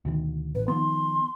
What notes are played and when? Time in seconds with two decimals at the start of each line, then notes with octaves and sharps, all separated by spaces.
0.05 D2 B2 D#3
0.55 A1 B4
0.68 D#3 F3 B3 C6